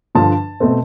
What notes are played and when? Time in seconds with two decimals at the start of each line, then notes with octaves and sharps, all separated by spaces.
0.15 G2 D3 F3 A5
0.60 B2 A3 C4